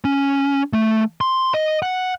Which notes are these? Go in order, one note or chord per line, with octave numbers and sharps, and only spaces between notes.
C#4
A3
C6
D#5
F#5